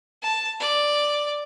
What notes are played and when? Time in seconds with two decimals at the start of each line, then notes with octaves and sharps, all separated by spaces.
0.23 A5
0.60 D5